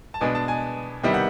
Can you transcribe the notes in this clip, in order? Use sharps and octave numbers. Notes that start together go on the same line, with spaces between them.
A5
B2 G#3 B3 D4 G#5
A5
G#5
C3 D#3 G3 B3 E4 G5
F#5